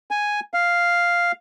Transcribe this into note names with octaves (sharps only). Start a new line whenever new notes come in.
G#5
F5